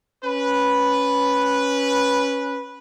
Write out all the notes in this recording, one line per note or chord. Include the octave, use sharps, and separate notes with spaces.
C#4 B4